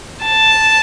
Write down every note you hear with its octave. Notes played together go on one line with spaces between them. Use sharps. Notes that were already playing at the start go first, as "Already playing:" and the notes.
A5